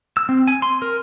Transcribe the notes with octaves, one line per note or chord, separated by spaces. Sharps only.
E6
C4
G#5
C6
A#4